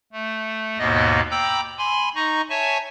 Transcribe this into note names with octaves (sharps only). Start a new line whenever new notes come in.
A3
D#2 G#2 B2 A#3 B3 D#5
G5 A#5 B5 D6 E6 G6
G#5 B5 C6
D#4 D#5 A#5 C#6
C#5 E5 G#5 A5 C#6